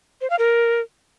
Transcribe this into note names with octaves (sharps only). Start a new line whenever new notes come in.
C5
F5
A#4